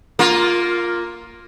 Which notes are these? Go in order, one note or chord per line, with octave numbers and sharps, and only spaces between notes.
A#3 F4